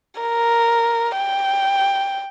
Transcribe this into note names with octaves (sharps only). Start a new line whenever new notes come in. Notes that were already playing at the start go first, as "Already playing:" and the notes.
A#4
G5